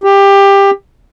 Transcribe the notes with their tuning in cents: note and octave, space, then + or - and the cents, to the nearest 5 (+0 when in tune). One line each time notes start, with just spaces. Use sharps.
G4 +15